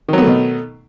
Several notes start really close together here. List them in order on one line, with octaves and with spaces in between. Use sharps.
D#3 F#3 B3 A3 B2